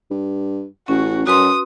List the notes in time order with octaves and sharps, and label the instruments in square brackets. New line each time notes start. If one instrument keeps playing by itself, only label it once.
[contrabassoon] G2
[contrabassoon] A1 [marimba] C#4 [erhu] F#4
[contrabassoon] F#2 [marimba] F#4 B4 C6 [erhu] D#6